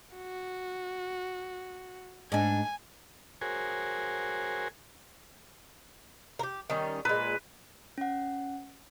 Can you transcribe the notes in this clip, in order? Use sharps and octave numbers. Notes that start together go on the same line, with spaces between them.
F#4
G#2 D4 G#5
F#4 G#4 A#4 C5 C#5 G#5
G4 A#4
D#3 G3 C#4
A#2 G#3 B4
C#4 F#5